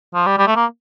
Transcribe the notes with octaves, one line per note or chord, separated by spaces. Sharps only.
F3
G3
G3
A3
A#3